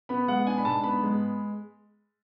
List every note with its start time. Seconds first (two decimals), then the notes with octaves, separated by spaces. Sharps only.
0.09 B3 B5
0.28 G#3 F#5
0.47 D4 G#5
0.58 B5
0.65 G#2 A5
0.84 B3 B5
1.03 G#3